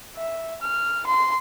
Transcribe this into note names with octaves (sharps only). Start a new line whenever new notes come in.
E5
F6
C6